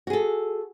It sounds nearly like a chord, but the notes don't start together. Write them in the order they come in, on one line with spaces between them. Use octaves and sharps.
F#4 G#4 A4